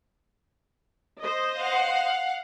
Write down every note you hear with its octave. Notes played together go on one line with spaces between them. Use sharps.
C5 D#5
F5 F#5